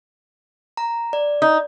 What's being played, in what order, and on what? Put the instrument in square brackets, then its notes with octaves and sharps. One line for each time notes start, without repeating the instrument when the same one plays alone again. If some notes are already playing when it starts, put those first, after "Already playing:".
[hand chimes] A#5
D5
[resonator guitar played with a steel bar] D#4